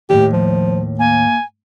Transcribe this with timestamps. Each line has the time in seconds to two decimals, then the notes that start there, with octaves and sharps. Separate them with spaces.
0.10 D#2 A2 G4
0.33 F3
0.99 A#3 G#5